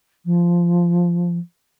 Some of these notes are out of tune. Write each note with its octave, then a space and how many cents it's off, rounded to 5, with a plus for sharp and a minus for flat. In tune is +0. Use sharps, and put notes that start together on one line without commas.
F3 -10